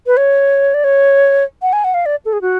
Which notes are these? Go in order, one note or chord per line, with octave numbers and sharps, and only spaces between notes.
B4
C#5
D5
C#5
F#5
G#5
F#5
F5
D5
A4
G#4
F#4